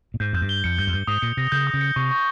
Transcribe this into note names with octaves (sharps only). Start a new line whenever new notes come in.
A#2
G#2 G6
F2 G6
G2
G7
F2 C#7
G2 G6
F2
G2 G6
G#2 D#6
A#2 C#7
C3 A#6
C#3 G6
D#6
C#3
C#7
C3 C#6
C#6